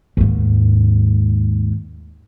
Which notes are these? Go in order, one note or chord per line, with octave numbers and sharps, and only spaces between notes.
D#2 G#2